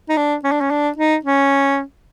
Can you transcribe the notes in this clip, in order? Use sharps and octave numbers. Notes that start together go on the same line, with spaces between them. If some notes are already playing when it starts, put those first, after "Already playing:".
D#4
D4
C#4
D4
C#4
D4
D#4
C#4